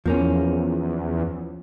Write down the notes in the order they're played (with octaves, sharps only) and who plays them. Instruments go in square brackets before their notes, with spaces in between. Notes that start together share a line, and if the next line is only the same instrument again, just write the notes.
[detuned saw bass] E2 [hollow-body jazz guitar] F3 A#3 C#4